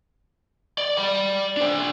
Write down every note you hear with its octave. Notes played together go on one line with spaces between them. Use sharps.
D5
D5 B5
D4 C5